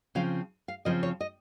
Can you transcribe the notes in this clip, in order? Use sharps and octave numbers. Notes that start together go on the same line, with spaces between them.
C#3 F3 C4 F5
F5
C#3 F3 C4 D#5
C#5
D#5